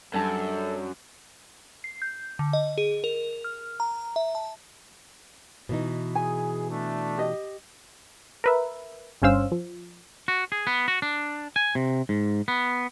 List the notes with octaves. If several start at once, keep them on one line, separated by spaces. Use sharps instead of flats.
F#2 G3 D4 A4 C5 D5 A5
C7
G6
D3
D#5
G#4
A#4
F6
A#5
E5
A5
B2 E3 D#4
G#4 G#5
A3 D4
G4 D#5
A#4 B4 E5
G1 G2 C#4 C5 F5 E6
F3
F#4
G#4
B3
F#4
D4
G#5
C3
G#2
B3